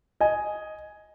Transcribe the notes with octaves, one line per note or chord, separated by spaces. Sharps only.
D#5 G#5